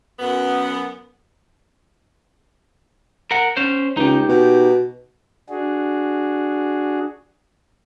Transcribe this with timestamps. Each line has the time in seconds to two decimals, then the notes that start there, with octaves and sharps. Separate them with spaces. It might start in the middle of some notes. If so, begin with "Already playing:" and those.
0.19 F#2 B3
3.31 A#4 F#5
3.57 C#4 C5
3.97 C#2 D#4 G4
4.29 B2
5.50 D4 F#4 G#4